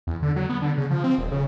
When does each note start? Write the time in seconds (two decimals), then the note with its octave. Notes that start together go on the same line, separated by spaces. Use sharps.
0.07 E2
0.22 D3
0.36 F#3
0.49 B3
0.62 D3
0.78 C#3
0.91 F3
1.04 C4
1.18 D#1
1.32 C#3